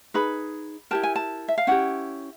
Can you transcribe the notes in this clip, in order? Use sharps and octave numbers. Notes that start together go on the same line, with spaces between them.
D#4 G#4 B4 B5
E4 G4 A#4 A5
G#5
A5
E5
F5
C#4 E4 G4 F#5